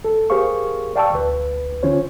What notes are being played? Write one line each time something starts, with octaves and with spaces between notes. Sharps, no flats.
A4
G4 G#4 A#4 C5 F5 C#6
D5 F5 G5 A5 C#6 E6
D2 B4
D3 C#4 F4 C5 C#5